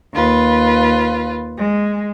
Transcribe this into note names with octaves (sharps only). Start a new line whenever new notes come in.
D#2 F4 B4
G#3